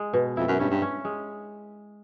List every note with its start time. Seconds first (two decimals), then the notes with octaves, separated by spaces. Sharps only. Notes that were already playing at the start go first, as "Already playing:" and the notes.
Already playing: G#3
0.14 B2
0.37 F2 E4
0.48 F#2
0.59 G2 C#4
0.70 G2
0.82 C#4
1.05 G#3